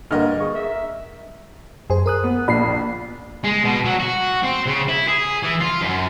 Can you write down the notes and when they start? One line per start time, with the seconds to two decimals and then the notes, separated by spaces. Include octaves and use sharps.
0.11 G2 D3 A#3 A#4 D#5 F6
0.40 G#4 C#6
0.55 E5
1.90 F#2 G#4 C5
2.06 A#4 D#6 F#6
2.24 B3
2.48 A#1 B5 C7
3.44 G#3
3.64 B2
3.85 F#3
4.00 F#4
4.44 C4
4.67 C#3
4.88 E4
5.08 G#4
5.43 E3
5.60 F4
5.82 F#2